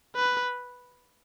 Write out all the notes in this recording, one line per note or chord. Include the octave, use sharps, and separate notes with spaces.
B4